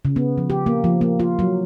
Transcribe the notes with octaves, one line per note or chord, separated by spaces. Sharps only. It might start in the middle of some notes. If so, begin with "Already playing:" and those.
C#3
B3
F3
G4
A#3
F3
A#3
F4
F#3